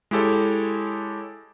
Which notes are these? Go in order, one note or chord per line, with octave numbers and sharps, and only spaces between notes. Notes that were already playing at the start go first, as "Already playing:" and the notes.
G#3 E4 G4 A4 C#5